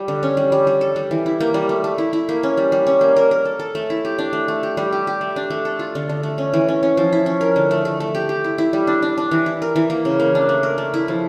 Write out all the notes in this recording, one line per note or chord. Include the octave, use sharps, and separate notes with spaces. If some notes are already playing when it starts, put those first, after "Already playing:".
Already playing: G3
D3
C#4
G3
G3
G3
A4
G3
E3
E4
A#3
G3
A3
A3
E4
E4
A#3
C#4
G3
G3
C#4
A#3
A#4
A#4
A4
A4
A3
E4
G4
D4
A3
A3
G4
G3
G4
G4
A3
D4
A3
A4
F4
D3
D3
A3
C#4
E3
C#4
C#4
F3
E4
C#4
A#4
D3
A3
A3
A3
G4
G4
E4
E4
G3
D4
D4
D4
E3
E4
A#4
E3
A#3
C#3
A#3
D4
A3
A#4
A3
E4
F3